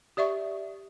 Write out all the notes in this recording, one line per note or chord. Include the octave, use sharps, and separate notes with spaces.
G4 D5 E5 C#6